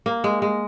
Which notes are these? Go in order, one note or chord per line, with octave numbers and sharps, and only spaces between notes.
A#3
G#3
G#3